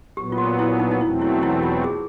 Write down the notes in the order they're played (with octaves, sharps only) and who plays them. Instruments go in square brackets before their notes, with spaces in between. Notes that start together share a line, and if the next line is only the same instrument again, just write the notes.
[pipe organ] A#2 F#3 B3 [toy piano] G4
[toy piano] F4
F#4
E4
D#4
D#4
[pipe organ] E2 B2 F#3 A3 C4 [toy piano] E4
[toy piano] E4
E4
F4
G#4